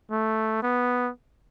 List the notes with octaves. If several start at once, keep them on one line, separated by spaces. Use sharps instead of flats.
A3
B3